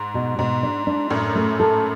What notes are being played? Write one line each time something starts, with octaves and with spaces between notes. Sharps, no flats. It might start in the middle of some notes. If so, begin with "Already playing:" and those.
Already playing: G#2
B2
G#2 B2
D4
D4
F#2 A2 D4
A3
A4